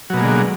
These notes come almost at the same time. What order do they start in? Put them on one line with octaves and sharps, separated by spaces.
F#3 B2 A#3 G#3 D3